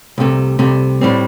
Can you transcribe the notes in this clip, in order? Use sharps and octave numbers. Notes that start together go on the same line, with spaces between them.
C2 C3 A3
C2 C3 A3
A2 G3 C4